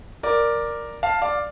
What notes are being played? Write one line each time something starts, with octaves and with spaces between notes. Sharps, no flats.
A#4 D5
F5 A5
D5 F5